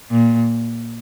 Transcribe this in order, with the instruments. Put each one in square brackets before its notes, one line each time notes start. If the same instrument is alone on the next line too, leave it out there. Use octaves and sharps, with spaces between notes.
[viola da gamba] A#2